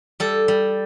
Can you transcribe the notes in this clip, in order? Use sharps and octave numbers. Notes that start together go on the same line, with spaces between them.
G3 A4
G3